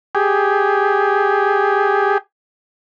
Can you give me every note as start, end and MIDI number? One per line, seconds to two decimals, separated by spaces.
0.15 2.18 67
0.15 2.18 68